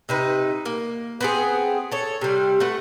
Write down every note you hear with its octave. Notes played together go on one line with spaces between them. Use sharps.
C3 D#4 B4
A#3
B3 C4 G#4
A4 C#5
C3 G3
A3 F#4 B4